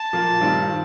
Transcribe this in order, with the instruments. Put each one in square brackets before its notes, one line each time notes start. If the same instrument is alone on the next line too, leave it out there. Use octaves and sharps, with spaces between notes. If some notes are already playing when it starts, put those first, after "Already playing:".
Already playing: [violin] A5
[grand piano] A#2 F3 A#3 F4
G2 D#3 G3 C4 F4
D#3